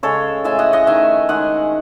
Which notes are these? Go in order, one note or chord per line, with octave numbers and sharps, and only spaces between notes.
C#3 G#3 A4 C#5
A2 G#3 E5 G#5
D#5 F#5
D#5 F#5
D#3 A3 E5 G#5
D#3 G#3 D#5 F#5